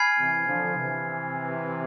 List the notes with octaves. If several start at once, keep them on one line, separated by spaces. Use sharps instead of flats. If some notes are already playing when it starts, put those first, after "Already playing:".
Already playing: G#5 B5 F6 G#6 C7
C3 E3
D3 F3
C3 E3